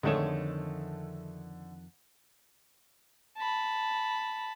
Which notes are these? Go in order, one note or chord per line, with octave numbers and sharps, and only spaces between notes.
F2 D3 D#3 G#3 A3 C#5 E7
A5 B5